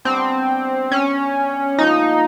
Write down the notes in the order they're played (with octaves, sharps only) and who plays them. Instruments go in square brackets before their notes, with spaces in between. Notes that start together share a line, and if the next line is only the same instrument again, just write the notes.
[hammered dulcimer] G3 B3 D4 G4 [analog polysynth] C4
[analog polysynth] C#4
[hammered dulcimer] A#2 F3 G#3 [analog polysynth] D#4